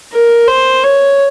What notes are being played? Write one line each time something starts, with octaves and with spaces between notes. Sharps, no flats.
A#4
C5
C#5